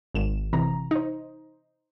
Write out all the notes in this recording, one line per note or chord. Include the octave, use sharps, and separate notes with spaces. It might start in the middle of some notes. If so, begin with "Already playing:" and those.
G#1 E7
C3 E3 A#5
D#4 C5